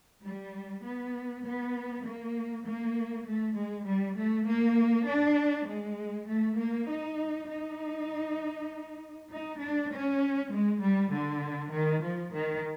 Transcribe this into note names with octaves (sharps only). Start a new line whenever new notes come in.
G3
B3
B3
A#3
A#3
A3
G#3
G3
A3
A#3
D4
G#3
A3
A#3
D#4
D#4
D#4
D4
C#4
G#3
G3
D3
D#3
F3
D#3